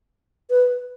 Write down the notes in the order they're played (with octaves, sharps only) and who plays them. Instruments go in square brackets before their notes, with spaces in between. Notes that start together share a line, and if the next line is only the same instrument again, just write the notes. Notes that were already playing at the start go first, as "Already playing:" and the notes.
[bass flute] B4